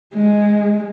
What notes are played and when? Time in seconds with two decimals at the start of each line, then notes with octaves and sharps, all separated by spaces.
0.14 G#3